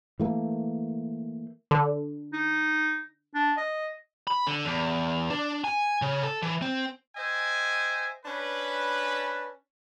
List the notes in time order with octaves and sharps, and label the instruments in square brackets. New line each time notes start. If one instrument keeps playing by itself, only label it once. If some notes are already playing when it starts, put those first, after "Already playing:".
[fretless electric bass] E3 A3 A#3
[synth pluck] D3
[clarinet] D#4
D4
D#5
[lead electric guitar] B5
D3
E2
D4
G#5
C#3
A4
E3
C4
[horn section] C5 D#5 E5 G5 G#5
C#4 D4 B4